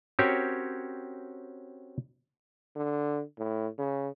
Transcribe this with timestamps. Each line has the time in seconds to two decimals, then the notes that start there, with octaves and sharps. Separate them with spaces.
0.19 C4 C#4 F#4 G4 A#4 C#5
2.76 D3
3.38 A2
3.78 C#3